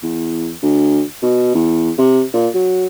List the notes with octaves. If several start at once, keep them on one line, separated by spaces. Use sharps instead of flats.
E2
D2
B2
E2
C3
A#2
F#3